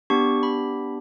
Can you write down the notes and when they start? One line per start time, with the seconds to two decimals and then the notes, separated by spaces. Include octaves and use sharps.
0.10 B3 D4 G4 C#6
0.43 B5